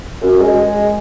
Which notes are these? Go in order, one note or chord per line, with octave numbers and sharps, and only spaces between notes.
F#2
G#3